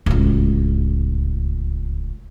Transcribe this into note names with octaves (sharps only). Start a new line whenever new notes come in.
D1 C#2